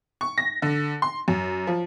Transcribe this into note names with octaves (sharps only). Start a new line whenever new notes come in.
C#6
A#6
D3
C6
F#2
F3